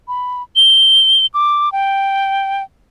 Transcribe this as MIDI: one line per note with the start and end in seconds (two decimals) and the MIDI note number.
0.08 0.42 83
0.56 1.26 103
1.34 1.72 86
1.72 2.63 79